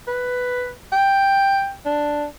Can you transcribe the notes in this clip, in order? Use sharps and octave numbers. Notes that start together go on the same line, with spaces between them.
B4
G5
D4